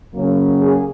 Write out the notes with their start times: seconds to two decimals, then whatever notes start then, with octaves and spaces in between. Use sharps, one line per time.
0.14 F#2 C#3 F#3 A#3 C#4
0.60 G#4